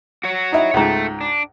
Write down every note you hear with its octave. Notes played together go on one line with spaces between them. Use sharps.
F#4 C#5
D#4 E4
C#2 G#2 A3
D4